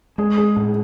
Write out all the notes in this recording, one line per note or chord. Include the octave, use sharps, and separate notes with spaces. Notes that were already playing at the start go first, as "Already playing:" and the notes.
G#3 G#4
G#4
A2 G#4